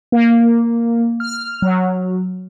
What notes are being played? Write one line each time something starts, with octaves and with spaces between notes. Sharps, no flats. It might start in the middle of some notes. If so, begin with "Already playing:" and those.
A#3
F6
F#3